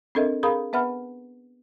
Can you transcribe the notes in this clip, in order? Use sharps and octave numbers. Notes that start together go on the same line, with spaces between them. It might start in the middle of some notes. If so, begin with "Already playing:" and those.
C4 D4 A4 A#4 D#5 E5
G#4 A#4 F5 A#5 B5 D#6
B3 B4 E5 F#5 B5 F6